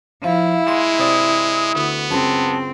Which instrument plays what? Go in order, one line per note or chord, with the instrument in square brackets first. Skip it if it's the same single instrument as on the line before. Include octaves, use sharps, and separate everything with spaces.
[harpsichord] F3 [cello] E4 [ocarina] F5
[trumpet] G#3 [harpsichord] C6
[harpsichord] C3 C4 D5 [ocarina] D#6
[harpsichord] D2 [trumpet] B3
[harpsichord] C#2 F#2 G#4 [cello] C4 [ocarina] A5